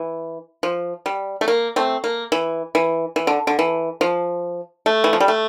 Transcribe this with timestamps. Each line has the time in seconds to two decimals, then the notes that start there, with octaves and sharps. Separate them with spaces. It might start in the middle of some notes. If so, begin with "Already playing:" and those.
Already playing: E3
0.63 F3
1.06 G3
1.41 A3
1.48 A#3
1.76 A3 C4
2.04 A#3
2.32 E3
2.75 E3
3.16 E3
3.27 D3
3.47 D3
3.59 E3
4.01 F3
4.86 A3
5.04 E3
5.13 F3
5.20 G3
5.28 A3